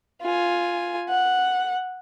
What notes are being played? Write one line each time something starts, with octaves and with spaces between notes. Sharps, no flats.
F4 G#5
F#5